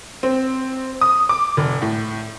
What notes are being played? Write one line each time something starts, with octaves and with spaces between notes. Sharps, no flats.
C4
D#6
D6
F1
A2